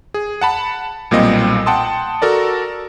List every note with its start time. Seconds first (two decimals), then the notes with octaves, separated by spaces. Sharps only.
0.14 G#4
0.41 F#5 A5 B5
1.11 B1 A#2 G3 A#3 C4 D#5
1.66 F#5 G5 A5 C6 D#6
2.22 F#4 A4 A#4 D5